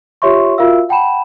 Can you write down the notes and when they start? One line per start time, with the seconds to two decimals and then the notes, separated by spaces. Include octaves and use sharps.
0.22 F4 G4 C#5 E5 C6 C#6
0.58 F4 F#4 A#4 E5 F5 E6
0.89 F#5 G5 A5 B5 E7